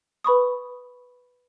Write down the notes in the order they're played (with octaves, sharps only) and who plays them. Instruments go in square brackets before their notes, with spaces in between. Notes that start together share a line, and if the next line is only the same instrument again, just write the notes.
[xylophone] B4 B5 C#6 D#6